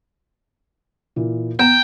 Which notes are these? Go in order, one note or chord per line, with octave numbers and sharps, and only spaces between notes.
A#2 E3
B3 G5 A#5 E7